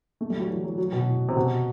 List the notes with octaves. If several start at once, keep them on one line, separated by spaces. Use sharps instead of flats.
A3
G3
F#3
E3
F#3
F#3
B2
A2
C3
B2